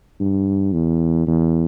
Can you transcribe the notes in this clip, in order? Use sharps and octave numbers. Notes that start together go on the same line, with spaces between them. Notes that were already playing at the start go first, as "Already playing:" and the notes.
G2
E2
E2